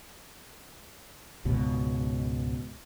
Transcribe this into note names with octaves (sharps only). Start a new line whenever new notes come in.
C#2 G#2 B2